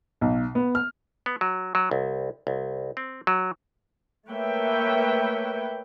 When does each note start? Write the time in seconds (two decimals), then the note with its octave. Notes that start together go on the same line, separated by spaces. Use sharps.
0.21 B1
0.55 B3
0.75 F6
1.26 B3
1.41 F#3
1.75 F#3
1.91 C2
2.47 C2
2.97 C4
3.27 F#3
4.28 A3 A#3 B4 C#5 E5 G5